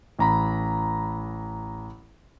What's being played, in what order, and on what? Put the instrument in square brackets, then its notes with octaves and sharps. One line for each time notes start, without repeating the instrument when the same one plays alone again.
[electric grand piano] A1 A#5 B5